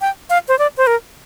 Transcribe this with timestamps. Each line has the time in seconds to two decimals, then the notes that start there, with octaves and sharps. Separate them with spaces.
0.01 G5
0.30 F5
0.48 C5
0.59 D5
0.77 C5
0.87 A#4